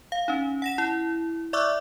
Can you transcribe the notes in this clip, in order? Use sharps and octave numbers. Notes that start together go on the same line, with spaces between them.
F5
C#4 D#4
F#5 A#6 E7
E4
D5 E5 C#6 D6 E6 F#6